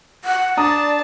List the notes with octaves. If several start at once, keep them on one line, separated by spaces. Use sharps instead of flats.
F#5
D4 D5 A5 A#5 D#6